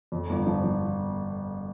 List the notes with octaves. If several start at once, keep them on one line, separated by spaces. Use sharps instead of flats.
F2
G1
F3
F3